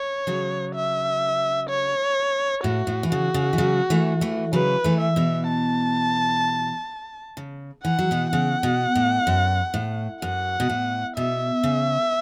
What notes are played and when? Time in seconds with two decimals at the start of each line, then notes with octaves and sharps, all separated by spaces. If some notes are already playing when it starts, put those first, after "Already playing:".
Already playing: C#5
0.27 C#3 F#3
0.75 E5
1.70 C#5
2.64 A2 F#4
2.87 A2
3.03 E3
3.12 C#3 F#4
3.34 C#3
3.53 E3
3.58 C#3 F#3
3.90 E3 A3
4.21 E3 A3
4.53 C#3 F#3 B4
4.84 E3 A3
5.01 E5
5.16 B2 E3
5.48 A5
7.37 C#3
7.84 E3 F#5
7.99 F#3
8.11 B2 E3
8.32 C#3 F#5
8.63 B2
8.95 A2
9.27 F#2
9.74 A2
10.21 F#2 F#5
10.60 B2
10.70 A2
11.16 B2 E5
11.63 C#3